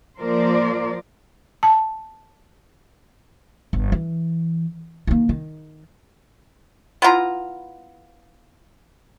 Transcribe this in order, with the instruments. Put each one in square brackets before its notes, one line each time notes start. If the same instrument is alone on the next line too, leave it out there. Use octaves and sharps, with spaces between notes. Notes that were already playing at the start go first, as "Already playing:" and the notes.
[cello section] F3 A#3 A#4 C5 D5
[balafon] A5
[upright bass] G1
E3
D#3 A#3
D#3
[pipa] B3 E4 F4 A#5